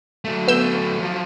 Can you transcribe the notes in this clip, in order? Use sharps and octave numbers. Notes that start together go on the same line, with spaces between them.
F#3 A3
B3 E6 G6
F3 F#3